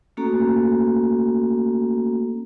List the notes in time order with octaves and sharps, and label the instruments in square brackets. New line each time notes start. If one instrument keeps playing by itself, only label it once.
[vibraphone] A3 A#3 C#4 F#4 A4 A#5